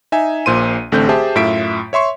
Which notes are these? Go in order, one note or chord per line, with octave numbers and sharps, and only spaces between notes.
D#4 E5 G#5
A#1 A#2 C5 C6 D#7
A1 D3 A3 C4 G6
G4 G#4 C5 E5 A5
F#2 A2 F4 E5 B6 D7
C#5 E5 C6 C#6